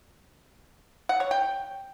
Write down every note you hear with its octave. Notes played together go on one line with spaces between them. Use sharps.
F#5
C#5
G5